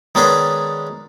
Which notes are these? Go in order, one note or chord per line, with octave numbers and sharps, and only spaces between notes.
D#3 G#3 B3 C#4 D4 G#4